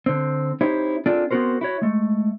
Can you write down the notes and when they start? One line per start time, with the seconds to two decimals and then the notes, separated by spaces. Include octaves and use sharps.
0.06 D3 C4
0.61 C4 D#4 E4 G4 C5 C#5
1.06 C4 D4 F4 G#4 A4 D5
1.31 B3 C4 D4 F#4 A#4 C5
1.61 E4 F#4 C#5
1.82 G#3 A3